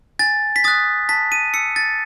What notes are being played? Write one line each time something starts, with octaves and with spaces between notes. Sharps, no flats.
G#5 A6
B6
D#6 F#6 A6
A5 B6
D#7
E6 C#7
A6